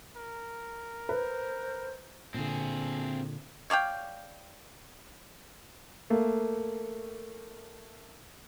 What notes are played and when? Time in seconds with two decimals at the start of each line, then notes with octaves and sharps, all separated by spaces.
0.16 A#4
1.09 B4 C5
2.34 A#2 D3 C4 G#4
3.70 C#5 D5 F5 G5
6.10 A3 A#3